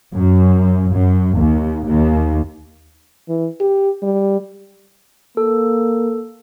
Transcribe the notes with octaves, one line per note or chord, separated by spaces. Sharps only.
F#2
F#2
D#2
D#2
E3
G4
G3
A#3 A4